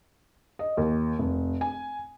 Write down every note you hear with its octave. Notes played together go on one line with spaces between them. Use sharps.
D#5
D#2
F1
G#5